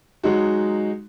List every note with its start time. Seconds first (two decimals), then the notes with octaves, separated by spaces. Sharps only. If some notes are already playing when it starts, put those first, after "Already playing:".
0.23 F#3 G#3 D#4 F#4